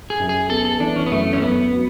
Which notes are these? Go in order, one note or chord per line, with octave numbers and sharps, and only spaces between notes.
G#4
F#2
G#4
B3 A4
A4
E3 D4
C#4
B3
F#2 A3
C#4
F#2 B3
F#3